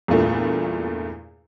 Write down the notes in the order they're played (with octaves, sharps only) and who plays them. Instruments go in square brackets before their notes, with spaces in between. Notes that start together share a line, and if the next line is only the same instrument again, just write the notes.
[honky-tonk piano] E2 G2 A#2 A3